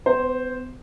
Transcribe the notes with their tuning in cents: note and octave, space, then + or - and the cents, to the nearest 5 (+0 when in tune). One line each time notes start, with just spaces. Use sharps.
B3 +40 C5 +0